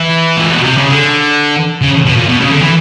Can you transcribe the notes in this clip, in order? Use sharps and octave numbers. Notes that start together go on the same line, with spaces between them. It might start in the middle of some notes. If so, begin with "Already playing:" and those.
Already playing: E3
A#2
B2
C3
C#3
D3
C#3
B2
A#2
B2
C#3
D3
E3